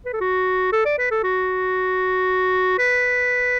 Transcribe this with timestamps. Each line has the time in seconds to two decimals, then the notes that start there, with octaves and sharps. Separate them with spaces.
0.06 B4
0.13 A4
0.21 F#4
0.73 A4
0.86 D5
0.98 B4
1.11 A4
1.24 F#4
2.79 B4